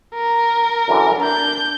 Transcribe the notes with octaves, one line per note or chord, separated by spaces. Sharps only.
A#4
F#2 D3 E3
D4 A#4 G6